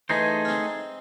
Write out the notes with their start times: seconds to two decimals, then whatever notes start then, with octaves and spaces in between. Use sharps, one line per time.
0.09 E3 G#3 A3 D#4 G#4 C5
0.45 C#4
0.49 G#3 C4